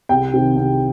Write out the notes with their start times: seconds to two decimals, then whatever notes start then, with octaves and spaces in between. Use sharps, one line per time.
0.09 C2 G5
0.34 C3 D#3
0.56 C2